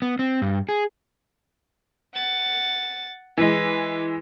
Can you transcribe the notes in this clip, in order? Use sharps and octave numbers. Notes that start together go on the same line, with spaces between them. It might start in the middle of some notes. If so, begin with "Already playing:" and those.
B3
C4
G2
G#4
F#5 A6
E3 G#3 B4